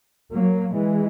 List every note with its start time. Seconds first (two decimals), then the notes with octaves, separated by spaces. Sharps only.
0.32 F#3 A#3
0.74 E3 G#3